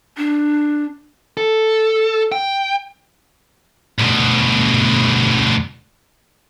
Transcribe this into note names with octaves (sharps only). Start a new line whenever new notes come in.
D4
A4
G5
D2 B2